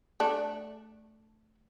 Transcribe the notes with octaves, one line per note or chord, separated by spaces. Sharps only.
A3 D4